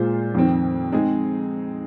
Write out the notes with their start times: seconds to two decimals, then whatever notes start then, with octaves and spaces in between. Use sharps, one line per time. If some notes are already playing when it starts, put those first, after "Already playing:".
Already playing: A#2 G#3 F4 C5
0.34 F2 D#3 C4
0.92 G#3 C4 D#4 G#4